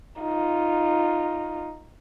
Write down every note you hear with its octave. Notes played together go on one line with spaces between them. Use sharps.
D#4 F4